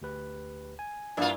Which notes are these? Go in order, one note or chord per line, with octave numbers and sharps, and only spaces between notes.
D2 G4 B4
G#5
G2 A#3 E4 F4